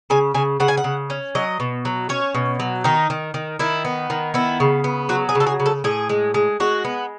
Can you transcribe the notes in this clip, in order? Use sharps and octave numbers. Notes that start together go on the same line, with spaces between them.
C#3 G#5
C#3 G#5
C#3 F#5
G#5
F#5
C#3
C#4
F#3 D#5
B2
F#3
C#4 C#5
B2
F#3
D#3 D#4
D#3
D#3
D#3 E4
B3
D#3
B3 E4
C#3
B3
F#3 F#4
G#4
C#3
A4
G#4
C#3
A4
A2 G#4
G#3
G#3
G#3 F#4
B3